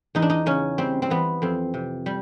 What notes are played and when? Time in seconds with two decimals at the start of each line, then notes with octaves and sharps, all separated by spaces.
0.15 E2 D#4
0.22 D4
0.30 D#4
0.46 C#3 C#4
0.78 G3 C4
1.02 C4
1.10 E3 B3
1.42 F2 C4
1.74 C3
2.06 G3